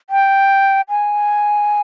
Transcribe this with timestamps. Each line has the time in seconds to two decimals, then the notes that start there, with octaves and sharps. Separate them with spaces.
0.10 G5
0.89 G#5